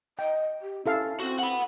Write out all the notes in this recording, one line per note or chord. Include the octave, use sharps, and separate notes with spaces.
D#5 G5
G4
C#4 E4 A4 F5
C4 F#4
F#5 B5